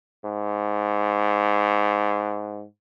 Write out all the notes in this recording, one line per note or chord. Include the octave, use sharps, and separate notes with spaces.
G#2